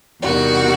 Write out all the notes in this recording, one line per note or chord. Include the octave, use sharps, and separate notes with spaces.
E2 C3 D#3 G3 F#4